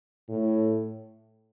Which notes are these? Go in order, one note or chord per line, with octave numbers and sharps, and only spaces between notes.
A2